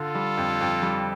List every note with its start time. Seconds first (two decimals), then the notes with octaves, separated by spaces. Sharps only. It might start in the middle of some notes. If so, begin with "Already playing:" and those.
Already playing: D3 F4 A4
0.15 G3
0.37 F2
0.61 F2
0.82 G3